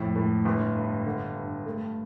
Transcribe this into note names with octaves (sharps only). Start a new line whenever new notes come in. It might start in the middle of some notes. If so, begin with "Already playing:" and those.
Already playing: F2 A2
A2
G1
G2
D3
G2
A3